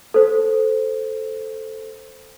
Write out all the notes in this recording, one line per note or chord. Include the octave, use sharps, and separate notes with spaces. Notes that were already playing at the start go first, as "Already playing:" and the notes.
A4 C5